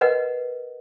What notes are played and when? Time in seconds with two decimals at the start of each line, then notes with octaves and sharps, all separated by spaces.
0.01 A#4 B4 D#5 F#5